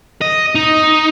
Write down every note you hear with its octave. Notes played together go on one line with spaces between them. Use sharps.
D#5
D#4